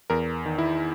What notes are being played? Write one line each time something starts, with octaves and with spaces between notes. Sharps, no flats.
E2 A#4
D#3
E4